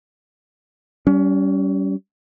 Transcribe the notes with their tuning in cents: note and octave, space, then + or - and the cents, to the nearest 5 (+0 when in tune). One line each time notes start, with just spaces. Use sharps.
G3 -20 C#4 +25